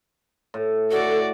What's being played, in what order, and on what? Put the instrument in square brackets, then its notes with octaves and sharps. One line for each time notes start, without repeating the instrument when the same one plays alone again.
[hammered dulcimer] A2
[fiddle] F#4 D5 [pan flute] A4